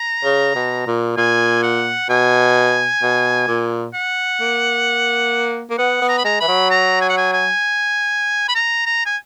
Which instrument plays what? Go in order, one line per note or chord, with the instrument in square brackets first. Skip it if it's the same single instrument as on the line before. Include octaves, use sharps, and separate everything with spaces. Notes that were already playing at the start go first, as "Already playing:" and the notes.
Already playing: [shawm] A#5
[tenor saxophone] C#3
B2
A#2
[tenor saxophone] A#2 [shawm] G#5
[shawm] F#5
[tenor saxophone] B2 [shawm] G#5
[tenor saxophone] B2
A#2
[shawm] F#5
[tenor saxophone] A#3
A#3
[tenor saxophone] B3 [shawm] F#5
[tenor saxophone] B3
[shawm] A#5
B5
[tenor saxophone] G#3 [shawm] A#5
[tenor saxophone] E3 [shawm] B5
[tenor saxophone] F#3
[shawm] A#5
G#5
F#5
G#5
G#5
B5
A#5
A#5
G#5